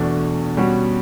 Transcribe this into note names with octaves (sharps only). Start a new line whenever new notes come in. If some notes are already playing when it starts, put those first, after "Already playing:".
Already playing: E2 B2 A3 D4
B2 G3 C#4 F#4